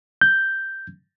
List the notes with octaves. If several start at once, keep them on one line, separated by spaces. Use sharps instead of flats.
G6